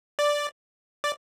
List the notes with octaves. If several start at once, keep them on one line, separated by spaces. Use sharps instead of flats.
D5
D5